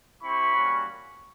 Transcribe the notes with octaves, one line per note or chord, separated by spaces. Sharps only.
C4 E4 G4 B5 C#6
G3 A#3 C#4 F#4